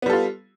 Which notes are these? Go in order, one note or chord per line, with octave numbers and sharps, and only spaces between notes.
G3 B3 F4 A4